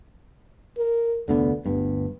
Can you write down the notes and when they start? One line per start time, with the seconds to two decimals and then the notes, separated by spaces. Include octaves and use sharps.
0.78 A#4
1.28 F1 D2 D3 B3
1.66 G1 D2 G2 B3